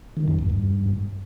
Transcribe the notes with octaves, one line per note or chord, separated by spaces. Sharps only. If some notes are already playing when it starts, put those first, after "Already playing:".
D#3
F#2
E2
G2